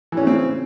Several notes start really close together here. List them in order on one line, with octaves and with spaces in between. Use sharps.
E3 C#4 C#3 C4